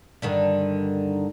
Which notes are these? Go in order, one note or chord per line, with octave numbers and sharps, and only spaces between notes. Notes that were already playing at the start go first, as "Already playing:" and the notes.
G2 D3 D#3